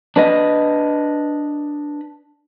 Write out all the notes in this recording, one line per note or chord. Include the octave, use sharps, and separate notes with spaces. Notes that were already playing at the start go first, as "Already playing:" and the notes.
D4 B4 D#5